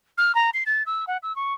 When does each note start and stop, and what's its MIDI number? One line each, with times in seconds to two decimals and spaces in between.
0.18 0.35 89
0.35 0.50 82
0.54 0.63 96
0.66 0.83 93
0.86 1.05 88
1.07 1.17 78
1.23 1.35 88
1.36 1.54 85